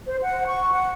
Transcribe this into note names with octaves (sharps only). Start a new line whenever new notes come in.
C5
F#5
C#6
F#5